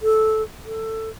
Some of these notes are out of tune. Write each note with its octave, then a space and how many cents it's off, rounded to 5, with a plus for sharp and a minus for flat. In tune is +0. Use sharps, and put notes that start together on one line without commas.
A4 -10
A4 +15